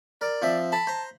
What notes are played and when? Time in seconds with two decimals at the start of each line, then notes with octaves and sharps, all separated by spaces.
0.21 A#4 D5
0.42 F3 C4 E5
0.72 A5 B5
0.87 C5 A#5